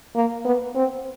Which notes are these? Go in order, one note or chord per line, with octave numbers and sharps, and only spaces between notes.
A#3
B3
C4